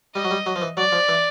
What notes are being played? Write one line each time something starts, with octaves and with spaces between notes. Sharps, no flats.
G3 D#5
F#3
G3
F#3
F3
E3
F#3 D5
F3
E3